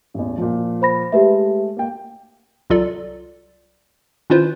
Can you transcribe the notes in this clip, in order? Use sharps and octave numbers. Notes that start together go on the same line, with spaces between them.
A1 E2
A#2 F3
C5 B5 A#6
G#3 A3 G4 B4 E5
A#3 G5
C2 F#3 F4 A4 D5
D#3 C#4 E4 F4 B4 C5